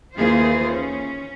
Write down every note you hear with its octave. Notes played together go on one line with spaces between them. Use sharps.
D#2 E3 A#3 F4 G#4 C5
C#4